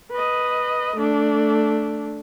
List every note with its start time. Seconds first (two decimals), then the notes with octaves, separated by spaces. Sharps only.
0.11 B4 D#5
0.96 A3 D4